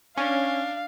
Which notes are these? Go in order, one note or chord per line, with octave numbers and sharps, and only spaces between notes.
C#4 D4 F5